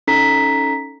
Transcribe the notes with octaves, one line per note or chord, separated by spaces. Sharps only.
C#4 D#4 A4 A#5 B6